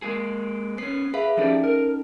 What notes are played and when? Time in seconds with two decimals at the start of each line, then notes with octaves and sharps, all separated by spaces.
0.02 G#3 A#3 G#4
0.78 B3 C#4 C7
1.14 G#4 B4 E5 F5
1.37 F3 C#4 D#4 G4 A4 D5
1.64 A#4